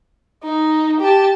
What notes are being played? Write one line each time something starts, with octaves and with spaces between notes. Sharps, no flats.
D#4
G4 A5